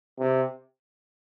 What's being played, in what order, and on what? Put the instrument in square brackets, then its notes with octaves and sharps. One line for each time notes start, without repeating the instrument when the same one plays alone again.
[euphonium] C3